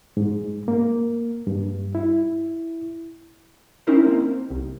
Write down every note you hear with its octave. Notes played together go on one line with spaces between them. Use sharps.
G#2
A#3
G2
E4
C4 C#4 D#4 E4 A#4 C5
A#3 C4
C2